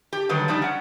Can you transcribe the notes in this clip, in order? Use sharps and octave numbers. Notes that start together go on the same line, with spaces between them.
G4
D3 D#3 F#3 G3 B4
F3 G3 D4 D#4
C#4 F#5